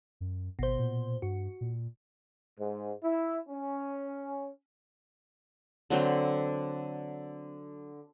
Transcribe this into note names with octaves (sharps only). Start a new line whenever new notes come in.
F#2
G#1 B2 C5
A#2
G2 F#4
A#2
G#2
E4
C#4
D3 F#3 C4